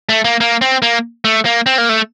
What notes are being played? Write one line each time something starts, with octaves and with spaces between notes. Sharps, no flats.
A3
A#3
A#3
C4
A#3
A3
A#3
C4
A#3
A3